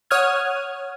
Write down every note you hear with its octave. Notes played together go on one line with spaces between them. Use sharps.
C#5 F#5 D#6 F6 G#6